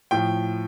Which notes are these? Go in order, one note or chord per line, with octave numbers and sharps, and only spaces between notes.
A2 F3 G5